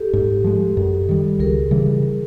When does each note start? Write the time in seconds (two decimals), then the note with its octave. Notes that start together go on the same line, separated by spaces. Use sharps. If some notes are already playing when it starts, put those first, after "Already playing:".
Already playing: G4 A4
0.13 G#2
0.44 F3 G#3
0.77 F#2
1.09 D#3 G3
1.39 C#2 G#4 A#4
1.71 C#3 E3 G3